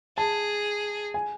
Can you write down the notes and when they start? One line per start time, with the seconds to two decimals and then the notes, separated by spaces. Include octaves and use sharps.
0.17 G#4 A5
1.14 G#5